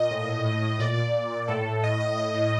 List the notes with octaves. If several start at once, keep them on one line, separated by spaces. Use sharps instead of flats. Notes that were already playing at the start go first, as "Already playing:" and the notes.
Already playing: A#2 D#5
A2
A2
A2
A2
A#2 D5
A#2
A#2
A#2
A2 A4
A2
A2 D#5
A2 D#5
A2 D#5
A2